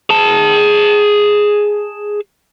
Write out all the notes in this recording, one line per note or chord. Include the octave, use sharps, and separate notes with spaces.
G#4 A5